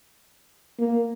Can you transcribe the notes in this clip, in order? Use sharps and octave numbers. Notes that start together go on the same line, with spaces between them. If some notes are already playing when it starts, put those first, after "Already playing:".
A#3